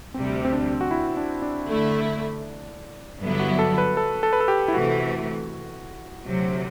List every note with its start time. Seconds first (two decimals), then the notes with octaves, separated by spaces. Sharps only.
0.14 D2 C3 G3 C4
0.45 C4
0.53 D4
0.81 F#4
0.91 E4
1.17 D4
1.42 D4
1.67 D3 A3 E4
3.21 G2 D3 F#3 B3 E4
3.39 F#4
3.59 A4
3.78 B4
3.97 A4
4.23 A4
4.33 B4
4.40 A4
4.48 G4
4.68 E4
4.74 C3 E3 A3 F#4
6.26 D2 C3 F#3